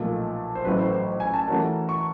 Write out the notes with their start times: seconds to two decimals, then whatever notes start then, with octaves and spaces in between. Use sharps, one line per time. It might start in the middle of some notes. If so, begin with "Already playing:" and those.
Already playing: B1 A#2 F3 A3
0.55 C5
0.65 A1 A2 F#3 B4
0.79 C5
0.92 C5
1.20 G#5
1.34 A5
1.48 E3 A3 C#4 F#4 A#4
1.89 C#6